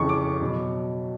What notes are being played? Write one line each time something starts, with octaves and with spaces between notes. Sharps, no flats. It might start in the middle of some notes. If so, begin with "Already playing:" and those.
Already playing: F2 C#3 E3 C#6
D6
B2 F#3